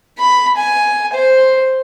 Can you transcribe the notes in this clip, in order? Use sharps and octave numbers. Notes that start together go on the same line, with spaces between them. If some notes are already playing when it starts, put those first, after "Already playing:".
B5
G#5
C5